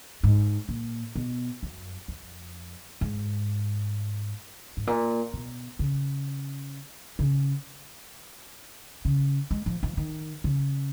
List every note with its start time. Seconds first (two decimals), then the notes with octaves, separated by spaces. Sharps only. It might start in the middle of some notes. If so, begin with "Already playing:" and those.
0.23 G#2
0.69 A#2
1.16 B2
1.63 F#2
2.08 F2
3.01 G#2
4.77 G#2
4.87 A#2
5.33 B2
5.79 C#3
7.19 C#3
9.05 C#3
9.51 G#3
9.66 F3
9.83 F3
9.97 D#3
10.44 C#3